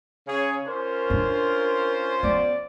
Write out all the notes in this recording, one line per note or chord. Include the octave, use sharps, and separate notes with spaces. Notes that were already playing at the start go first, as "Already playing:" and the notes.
C#3 G#4 C#5
C#4 F4 A#4 C5
D4
B3 D5